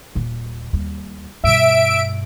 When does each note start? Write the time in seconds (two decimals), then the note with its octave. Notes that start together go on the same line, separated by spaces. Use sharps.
0.15 D#1 A#2
0.73 D#2 G3
1.44 G2 B2 E5 D7